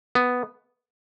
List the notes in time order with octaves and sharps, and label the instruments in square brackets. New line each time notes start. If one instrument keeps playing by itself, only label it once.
[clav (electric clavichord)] B3